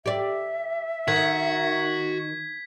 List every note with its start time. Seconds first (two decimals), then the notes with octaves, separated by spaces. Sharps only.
0.06 G4 D5 E5
1.08 D#3 F#4 G#6 B6